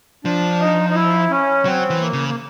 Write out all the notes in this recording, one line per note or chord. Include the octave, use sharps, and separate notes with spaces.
F3 D4
D#4
D#4
E4
C#4
F#3 C4
E3
A#3
C#3
A#3